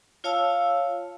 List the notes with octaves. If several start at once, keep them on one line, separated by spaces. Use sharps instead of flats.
F4 C#5 F5 A5 E6